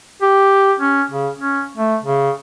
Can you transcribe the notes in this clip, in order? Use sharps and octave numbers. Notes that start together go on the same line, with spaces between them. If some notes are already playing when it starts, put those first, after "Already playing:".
G4
C#4
C#3
C#4
A3
C#3